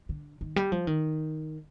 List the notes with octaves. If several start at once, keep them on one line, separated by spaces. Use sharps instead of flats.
D3
D#3
G3
F3
D#3